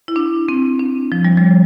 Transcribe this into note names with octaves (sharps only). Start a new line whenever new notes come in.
E4
D4
C4
D4
F3
G3
F3